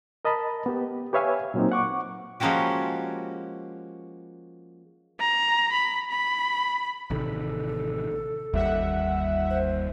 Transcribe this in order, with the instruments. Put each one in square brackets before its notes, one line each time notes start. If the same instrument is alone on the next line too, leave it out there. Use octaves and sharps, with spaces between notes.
[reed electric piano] A#4 D#5 A5 B5
B3 G4
G4 B4 C#5 E5 F5 G#5
A#2 F#3 A#3 C4 D#4
F#5 C#6 D6
[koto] F3 G#3 A#3 C#4 F#4 G4
[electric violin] A#5
B5
B5
[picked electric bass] A1 C3 D#3 [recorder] A4
[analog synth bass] G1 [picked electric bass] D#2 G3 [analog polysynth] E5 F#5
[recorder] C5